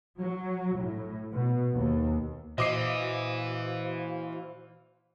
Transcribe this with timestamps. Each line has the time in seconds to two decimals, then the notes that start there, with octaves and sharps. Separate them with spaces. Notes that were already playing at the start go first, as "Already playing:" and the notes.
0.20 F#3
0.78 A2
1.35 B2
1.77 D#2
2.58 A#2 E3 F#4 C5 D#5 F5 D6 C7